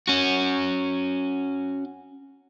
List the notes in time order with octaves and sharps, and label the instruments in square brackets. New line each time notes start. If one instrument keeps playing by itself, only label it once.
[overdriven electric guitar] C#4 F#4